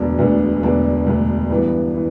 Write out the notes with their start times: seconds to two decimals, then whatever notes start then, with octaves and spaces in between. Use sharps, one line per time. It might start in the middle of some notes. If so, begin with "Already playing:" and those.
Already playing: E1 D2 D3 B3 D4
0.19 E1 D2 D3 B3 D4
0.63 E1 D2 D3 B3 D4
1.05 E1 D2 D3 B3 D4
1.50 G2 E3 B3
1.94 E3